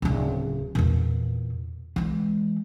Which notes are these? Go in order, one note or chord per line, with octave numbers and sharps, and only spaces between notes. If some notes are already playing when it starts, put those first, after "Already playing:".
D1 C#3
E2 A#2
E3 G#3